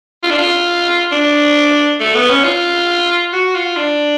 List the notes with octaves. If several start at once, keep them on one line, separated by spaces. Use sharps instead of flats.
F4
D4
F4
D4
A3
B3
C#4
F4
F#4
F4
D4